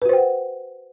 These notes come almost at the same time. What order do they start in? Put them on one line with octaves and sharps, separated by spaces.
B4 F#4 C5 G5 F#5